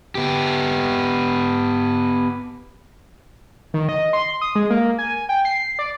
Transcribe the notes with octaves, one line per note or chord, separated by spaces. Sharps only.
B3 G4
D#3
D#5
C6
D#6
G#3
A#3
G#5
G5
C7
D5